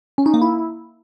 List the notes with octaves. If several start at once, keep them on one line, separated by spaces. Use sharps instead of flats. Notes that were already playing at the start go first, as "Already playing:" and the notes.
C#4
D#4
A#3
E4